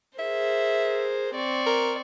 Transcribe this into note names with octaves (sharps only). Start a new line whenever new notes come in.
G#4 A#4 C5 E5
C4 D5 C#6
A#4